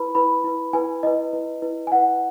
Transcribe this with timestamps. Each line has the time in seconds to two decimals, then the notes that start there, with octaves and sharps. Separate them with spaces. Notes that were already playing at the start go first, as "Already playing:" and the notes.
Already playing: E4 B4 B5
0.15 E4 B4 B5
0.44 E4 B4
0.73 E4 B4 G#5
1.03 E4 B4 D#5
1.33 E4 B4
1.62 E4 B4
1.87 G#5
1.92 E4 B4 F#5